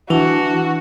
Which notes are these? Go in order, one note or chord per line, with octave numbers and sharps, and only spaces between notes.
E3 D4 E4 F#4 A5